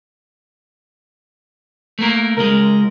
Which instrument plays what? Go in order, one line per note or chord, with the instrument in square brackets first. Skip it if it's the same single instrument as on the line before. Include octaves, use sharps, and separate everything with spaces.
[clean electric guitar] A3 A#3 A#4
[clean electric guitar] C#2 G#3 [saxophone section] A#4